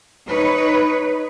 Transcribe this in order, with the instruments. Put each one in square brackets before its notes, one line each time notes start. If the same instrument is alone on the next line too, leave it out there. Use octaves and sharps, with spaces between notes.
[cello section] D#4 B4 C#5